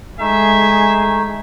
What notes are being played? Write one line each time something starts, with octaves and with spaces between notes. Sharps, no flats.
G#3 A3 D#4 G#4 E5